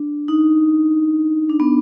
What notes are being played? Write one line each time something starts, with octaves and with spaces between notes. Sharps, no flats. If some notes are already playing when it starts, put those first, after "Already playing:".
Already playing: D4
D#4
D4
B3